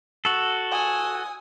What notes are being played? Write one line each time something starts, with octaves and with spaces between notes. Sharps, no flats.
F#4 A4
G#5 D#6